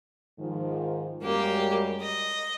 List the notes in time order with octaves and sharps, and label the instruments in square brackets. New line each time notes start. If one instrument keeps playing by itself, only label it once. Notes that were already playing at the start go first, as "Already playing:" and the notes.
[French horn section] G#2 D#3 F3
[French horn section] F#2 G3 G#3 [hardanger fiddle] A#3 G4
[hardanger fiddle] D#5